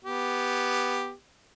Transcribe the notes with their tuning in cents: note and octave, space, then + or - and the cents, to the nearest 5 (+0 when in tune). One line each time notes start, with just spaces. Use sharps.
B3 +0 G4 +5